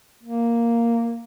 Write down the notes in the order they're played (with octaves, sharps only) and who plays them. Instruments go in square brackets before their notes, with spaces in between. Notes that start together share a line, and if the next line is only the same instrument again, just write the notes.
[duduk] A#3